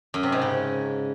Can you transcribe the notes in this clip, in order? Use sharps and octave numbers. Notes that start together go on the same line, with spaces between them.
F#2
C3
G#2
C#3